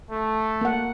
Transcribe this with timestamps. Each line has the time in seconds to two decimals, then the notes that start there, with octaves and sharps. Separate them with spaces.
0.11 A3
0.61 A#3 F#5